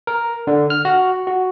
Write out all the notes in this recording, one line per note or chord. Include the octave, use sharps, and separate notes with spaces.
A#4
D3
F6
F#4
F#4